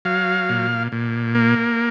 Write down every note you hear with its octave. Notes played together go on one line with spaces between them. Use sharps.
F#3 F5
A#2
A#2
A#3